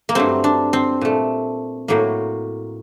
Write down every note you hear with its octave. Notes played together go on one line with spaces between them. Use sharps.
A#3
G2 F#3 A3 C4
D4
C4
A#2 A3
A2 F#3 A#3